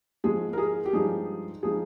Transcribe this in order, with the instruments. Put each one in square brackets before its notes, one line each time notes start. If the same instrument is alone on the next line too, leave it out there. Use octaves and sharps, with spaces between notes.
[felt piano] G#2 F3 G#3 G#4
A#4
G#4
G4
G2 F3 G#3 D#4 G#4
F3 G#3 D#4 G#4